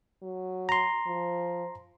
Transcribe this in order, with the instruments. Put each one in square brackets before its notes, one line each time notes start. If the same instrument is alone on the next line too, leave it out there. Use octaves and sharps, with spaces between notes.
[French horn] F#3
[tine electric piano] A#5 C6
[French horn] F3